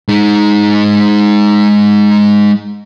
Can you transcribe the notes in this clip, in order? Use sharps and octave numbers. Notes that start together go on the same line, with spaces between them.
G#3 D#4